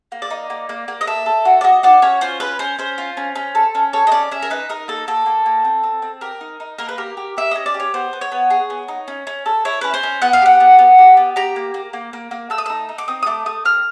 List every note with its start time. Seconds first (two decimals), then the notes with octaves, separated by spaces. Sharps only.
0.12 A#3
0.22 D5
0.30 D#4
0.50 A#3
0.69 A#3
0.88 A#3
1.01 D#5
1.07 A4 E5
1.26 A4
1.45 F#4
1.61 D5
1.64 F#4 D#5
1.83 F#4 D5
2.02 C#4 C#5
2.21 F4 C5
2.40 C#4 B4
2.59 C#4 C5
2.79 C#4 C5
2.98 F4
3.17 C#4
3.36 C#4
3.55 A4
3.75 C#4
3.93 A4 C#5
4.07 D#5
4.12 C#4 D5
4.31 C#4 E5
4.42 A#4
4.50 D#4 B4
4.69 D#4 A#4
4.88 A#3 A4
5.08 A#3 A4
5.26 A#3
5.46 A#3
5.65 C4
5.84 C4
6.02 C4
6.21 G4 A#4
6.41 D#4
6.60 D#4
6.78 A#3 A#4
6.89 B4
6.98 G4 A#4
7.17 G4
7.37 G4 E5
7.51 C#4 D#5
7.66 D5
7.74 G4
7.80 C#5
7.94 B3 C5
8.13 B3
8.21 C#5
8.32 B3
8.50 G#4
8.70 B3
8.88 D#4
9.08 C#4
9.27 C#4
9.46 A4
9.65 E4 C#5
9.81 C#4 B4
9.94 C5
10.03 C#4
10.22 B3 F#5
10.33 F5
10.42 G4 F#5
10.60 B3
10.79 B3
10.98 G4
11.17 B3
11.36 G4 A#5
11.56 A#3
11.74 A#3
11.93 A#3
12.13 A#3
12.31 A#3
12.50 A3 E6
12.58 D#6
12.66 D#4 E6
12.89 D#4
12.98 D6
13.08 C4 D#6
13.23 D#6
13.26 A3 D6
13.46 A3 D#6
13.65 C4 F6